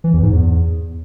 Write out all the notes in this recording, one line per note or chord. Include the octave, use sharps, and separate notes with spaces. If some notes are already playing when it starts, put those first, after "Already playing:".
E3
E2
G#2
E2